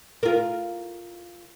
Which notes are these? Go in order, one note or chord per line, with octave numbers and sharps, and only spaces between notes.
F4 A#4